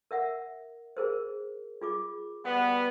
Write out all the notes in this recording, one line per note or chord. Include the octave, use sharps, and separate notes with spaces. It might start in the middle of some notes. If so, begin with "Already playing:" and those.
A#4 E5 F#5
G#4 A#4 C5
F4 G#4 D6
G3 B3 F#5